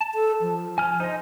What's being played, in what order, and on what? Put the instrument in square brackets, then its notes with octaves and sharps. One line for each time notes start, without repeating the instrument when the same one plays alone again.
[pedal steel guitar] A5
[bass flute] A4
F3
[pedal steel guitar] G#5 F6
[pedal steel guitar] D#4 D#5 [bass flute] C5